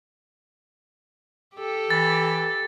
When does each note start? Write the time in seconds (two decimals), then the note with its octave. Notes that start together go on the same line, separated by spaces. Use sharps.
1.55 G4 A4
1.90 E3 A6